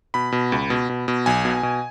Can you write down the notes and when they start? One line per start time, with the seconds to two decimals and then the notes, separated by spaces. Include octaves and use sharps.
0.14 B2 B5
0.32 B2
0.52 C#2
0.70 B2
0.89 B2
1.08 B2
1.26 B1 G#5
1.45 B2
1.63 B2